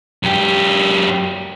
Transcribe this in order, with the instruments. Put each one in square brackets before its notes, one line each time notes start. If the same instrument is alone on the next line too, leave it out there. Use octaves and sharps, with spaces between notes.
[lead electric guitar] F#2 G4